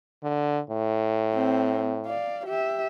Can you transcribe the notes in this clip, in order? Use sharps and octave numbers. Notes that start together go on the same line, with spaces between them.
D3
A2
C4
D5 F5
G4 E5